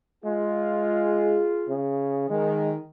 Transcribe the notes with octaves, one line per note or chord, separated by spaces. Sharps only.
G#3 F4 G#4
C#3
D#3 G#3